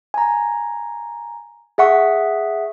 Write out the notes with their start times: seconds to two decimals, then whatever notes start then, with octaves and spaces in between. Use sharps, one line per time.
0.14 G#5 A#5
1.78 G#4 E5 F#5 C#6